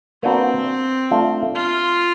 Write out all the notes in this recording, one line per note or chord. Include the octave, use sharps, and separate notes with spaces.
A#3 C4 D4 F#4 B4
A3 D4 F4
F4